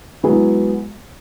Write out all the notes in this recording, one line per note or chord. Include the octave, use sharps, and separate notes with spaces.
G#2 F#3 B3 E4 G#4